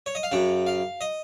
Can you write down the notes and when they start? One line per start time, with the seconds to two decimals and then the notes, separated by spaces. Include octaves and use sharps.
0.06 C#5
0.15 D#5
0.23 F5
0.32 F#2 C#3 F#5
0.67 F5
1.01 D#5